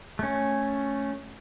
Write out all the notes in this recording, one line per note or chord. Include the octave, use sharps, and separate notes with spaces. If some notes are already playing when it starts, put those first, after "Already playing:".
A3 C#4